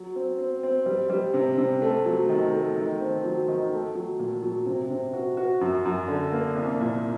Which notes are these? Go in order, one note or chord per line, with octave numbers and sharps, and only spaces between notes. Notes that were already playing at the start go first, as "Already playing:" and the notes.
Already playing: F#3
C4
C4
C4
G3
G3
C3
C3
A3
F#3
D#3
A3
D#3
C4
F#3
D#3
A3
F#3
A#2
F#3
C3
C3
F#4
F#4
F#2
F#2
D3
A#3
C2
A#2